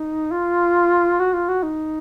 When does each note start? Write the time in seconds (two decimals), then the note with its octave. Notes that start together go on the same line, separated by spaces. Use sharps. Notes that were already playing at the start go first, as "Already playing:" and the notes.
Already playing: D#4
0.32 F4
1.20 F#4
1.33 F4
1.48 F#4
1.63 D#4